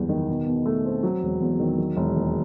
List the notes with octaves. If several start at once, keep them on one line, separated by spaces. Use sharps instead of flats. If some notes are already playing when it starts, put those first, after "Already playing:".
Already playing: F#1 E2 G3
D#3
B2
B2
A3
C4
F#3
E1
E2
D#3
F#3
E1
D#2